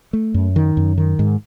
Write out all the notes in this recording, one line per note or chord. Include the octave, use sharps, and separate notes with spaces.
A3
F#2
D#3
F#2
D#3
G#2